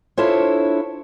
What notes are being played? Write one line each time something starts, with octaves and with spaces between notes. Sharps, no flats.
D4 E4 F4 A4 C5 C#5